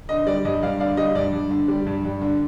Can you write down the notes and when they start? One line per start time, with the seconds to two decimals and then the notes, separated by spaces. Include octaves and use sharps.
0.09 D3 D#5
0.27 G3 D5
0.45 G2 D#5
0.62 G2 D5 F5
0.80 D3 D5 F5
0.97 G3 D#5
1.15 G2 D5
1.33 G2
1.50 D3
1.68 G3
1.86 G2
2.05 G2
2.21 D3